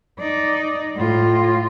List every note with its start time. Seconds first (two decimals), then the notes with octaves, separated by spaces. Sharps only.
0.19 D#4 D5
0.96 A2 F4